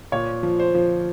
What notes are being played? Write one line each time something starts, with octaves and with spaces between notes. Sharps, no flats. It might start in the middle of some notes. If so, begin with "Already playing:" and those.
A#2 C#5
F3
C5
F3